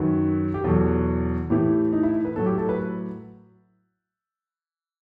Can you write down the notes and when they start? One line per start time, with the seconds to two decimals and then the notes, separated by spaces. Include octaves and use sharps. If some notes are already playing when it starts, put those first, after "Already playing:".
Already playing: F#2 D#3 F#3 B4
0.54 G4
0.64 E2 B2 F#3 A4
1.50 A2 E3 G4
1.93 D#4
2.03 E4
2.25 B4
2.36 A2 F#3 A4
2.46 G4
2.58 A4
2.69 B4